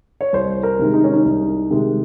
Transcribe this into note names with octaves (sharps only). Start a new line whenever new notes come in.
C#5
C2 C5
A#4
C3 D#3 G#3
D#4
C#4
D#4
C2
C3 D#3 G#3